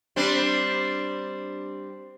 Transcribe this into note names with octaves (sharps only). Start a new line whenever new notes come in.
G3 C4 D4